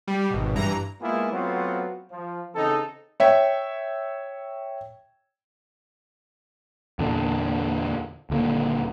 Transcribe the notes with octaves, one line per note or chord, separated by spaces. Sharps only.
G3
G#1 B2
G2 E3 A#5
G#3 A#3 B3 E4 F4 G#4
F#3 A3 B3 C4 F4 F#4
F3
C#3 E3 C4 D#4 A4
C#5 E5 G5
E2 A#2 D3 D4
D#1 D3 A#3